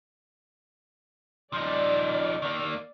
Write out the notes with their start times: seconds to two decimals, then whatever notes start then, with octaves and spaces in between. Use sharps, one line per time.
1.53 F3 D#4 D5
2.42 D#3 A#3